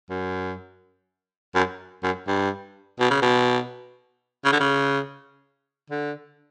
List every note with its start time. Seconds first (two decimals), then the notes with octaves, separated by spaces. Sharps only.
0.10 F#2
1.55 F#2
2.03 F#2
2.27 G2
3.00 B2
3.10 C#3
3.22 B2
4.45 C#3
4.53 D3
4.60 C#3
5.90 D3